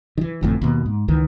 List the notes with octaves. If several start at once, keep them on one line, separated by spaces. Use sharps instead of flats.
D#3 E3
G1 F2 A2
D#2 B2 A#3
G#2
C#2 D#3 E3